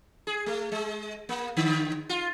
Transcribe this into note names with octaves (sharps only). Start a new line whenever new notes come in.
G#4
A3
G#3
A#3
D3
F4